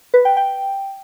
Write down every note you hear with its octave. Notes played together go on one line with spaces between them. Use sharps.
B4
G5
G5